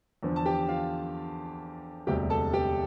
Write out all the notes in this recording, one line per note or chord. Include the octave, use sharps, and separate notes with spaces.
E2 D3 F3
A5
G4 G5
F4 F5
E1 D2 C3 G3 G4 G5
A4 A5
G4 G5